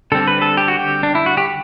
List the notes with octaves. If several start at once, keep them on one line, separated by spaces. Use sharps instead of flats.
D3 G3 C4 A4
B4
A4
G4
F#4
G4
D4
E4
F#4
G4